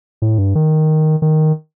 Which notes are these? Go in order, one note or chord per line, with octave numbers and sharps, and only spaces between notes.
A2
G2
D#3
D#3